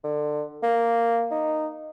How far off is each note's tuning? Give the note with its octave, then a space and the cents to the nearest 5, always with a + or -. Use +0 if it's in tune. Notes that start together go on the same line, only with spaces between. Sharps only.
D3 +25
A#3 -5
D#4 -10